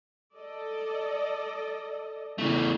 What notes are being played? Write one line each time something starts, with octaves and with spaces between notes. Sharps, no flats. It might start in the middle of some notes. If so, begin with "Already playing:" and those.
A4 D5 D#5
E2 C#3 A3